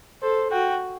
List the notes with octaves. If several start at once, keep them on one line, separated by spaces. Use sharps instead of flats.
A4 C5
F#4 G5